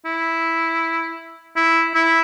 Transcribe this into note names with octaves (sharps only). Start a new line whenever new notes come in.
E4
E4
E4